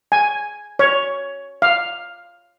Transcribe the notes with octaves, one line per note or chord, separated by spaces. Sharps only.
G#5
C#5
F5